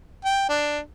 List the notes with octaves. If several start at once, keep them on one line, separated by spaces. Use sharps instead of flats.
G5
D4